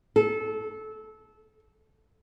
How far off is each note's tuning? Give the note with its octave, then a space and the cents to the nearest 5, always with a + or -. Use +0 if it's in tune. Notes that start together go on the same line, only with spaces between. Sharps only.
A4 -20